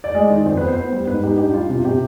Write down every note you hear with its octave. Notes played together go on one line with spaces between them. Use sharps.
D5
G#3 D#5
D#3 D5
F2 C5
B3 B4
C5
B3
G3
G#2 B4
D#4 G4
D4 G4
G3 F4
C3 F4
C3 G4